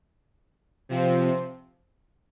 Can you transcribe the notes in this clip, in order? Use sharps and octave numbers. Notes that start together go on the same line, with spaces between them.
C3 F3 C4